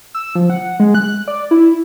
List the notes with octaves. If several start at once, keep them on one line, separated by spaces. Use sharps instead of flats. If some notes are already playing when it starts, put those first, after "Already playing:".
E6
F3
F#5
G#3
F#6
D5
E4